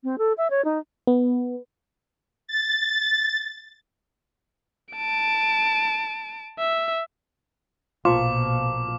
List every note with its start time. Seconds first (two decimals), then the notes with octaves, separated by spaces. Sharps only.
0.04 C4
0.18 A4
0.37 E5
0.50 C#5
0.65 D#4
1.07 B3
2.48 A6
4.93 A5 D7
6.59 E5
8.05 A#1 B2 F3 A#3 F4 C#6 D6